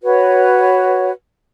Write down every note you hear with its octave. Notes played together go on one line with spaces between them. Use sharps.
F#4 B4 C#5